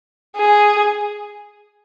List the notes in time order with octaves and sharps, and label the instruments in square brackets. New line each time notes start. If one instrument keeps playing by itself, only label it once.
[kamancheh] G#4